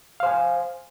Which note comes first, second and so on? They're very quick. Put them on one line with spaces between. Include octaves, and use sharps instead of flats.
F5 C5 G#5